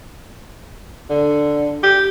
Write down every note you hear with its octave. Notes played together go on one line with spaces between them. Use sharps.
D3
G4